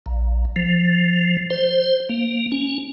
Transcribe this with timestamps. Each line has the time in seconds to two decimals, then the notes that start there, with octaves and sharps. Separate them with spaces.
0.06 A#1
0.56 F3
1.50 C5
2.09 A#3
2.52 C#4